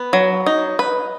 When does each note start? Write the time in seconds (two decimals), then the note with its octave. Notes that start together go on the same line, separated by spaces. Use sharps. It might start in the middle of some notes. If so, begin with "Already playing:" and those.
Already playing: B3
0.13 F#3
0.46 D#4
0.79 B4